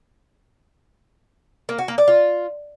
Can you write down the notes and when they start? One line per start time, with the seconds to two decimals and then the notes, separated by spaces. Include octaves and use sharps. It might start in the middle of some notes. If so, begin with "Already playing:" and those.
1.69 A#3
1.79 F#4
1.88 A#3
1.98 D5
2.08 F4